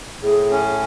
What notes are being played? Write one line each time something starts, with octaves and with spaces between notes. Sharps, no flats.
A2 G#4
C#4